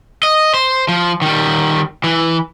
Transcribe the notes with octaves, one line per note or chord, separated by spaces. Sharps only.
D#5
C5
F3
D#3 G3
E3